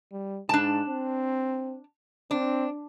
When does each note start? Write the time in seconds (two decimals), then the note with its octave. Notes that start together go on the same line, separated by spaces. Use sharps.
0.12 G3
0.49 G#2 D4 A5
0.89 C4
2.31 C4 D4